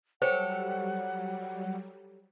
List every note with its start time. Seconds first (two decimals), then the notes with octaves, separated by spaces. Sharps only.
0.22 F#3 G3 G4 A4 C5 C#5 F#5